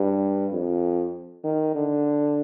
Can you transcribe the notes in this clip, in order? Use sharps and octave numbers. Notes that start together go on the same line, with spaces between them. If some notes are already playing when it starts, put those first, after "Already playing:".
Already playing: G2
F2
D#3
D3